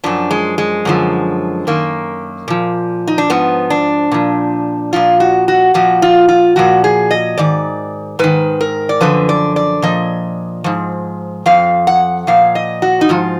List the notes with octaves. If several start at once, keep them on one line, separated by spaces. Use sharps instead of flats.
F#2 F3 D4
G#3
G#3
F#2 D3 F3
F#2 D#3 A#3
A#2 F3
D#4
D4
G#2 F3 B3
D4
A#2 F3
A#2 F3 F4
F#4
F#4
A#2 F3 F#4
F4
F4
A#2 F3 F#4
G#4
D#5
G#2 D#3 D5
G#2 D#3 B4
A#4
D5
F#2 D3 F3 B4
D5
D5
A#2 F3 D#5
G#2 F3
F2 F3 F5
F#5
A#2 F3 F5
D#5
F#4
D#4
G#2 F3 F4